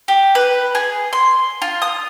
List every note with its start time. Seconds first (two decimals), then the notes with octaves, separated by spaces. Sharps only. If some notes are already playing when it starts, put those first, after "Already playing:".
0.08 G4
0.35 B4
0.75 G#4
1.13 C6
1.62 F4
1.82 D#6